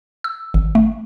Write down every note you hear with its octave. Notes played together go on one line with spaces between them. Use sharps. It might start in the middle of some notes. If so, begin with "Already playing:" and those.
E6
G#1
A3